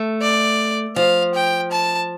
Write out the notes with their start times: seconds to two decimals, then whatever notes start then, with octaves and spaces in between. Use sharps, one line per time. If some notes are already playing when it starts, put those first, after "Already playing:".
Already playing: A3
0.22 D5
0.96 F3 F5
1.35 G5
1.71 A5